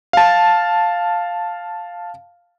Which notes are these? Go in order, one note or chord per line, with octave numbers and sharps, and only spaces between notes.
F5 A5